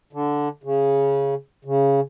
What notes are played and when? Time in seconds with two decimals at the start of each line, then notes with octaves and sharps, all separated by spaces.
0.13 D3
0.64 C#3
1.65 C#3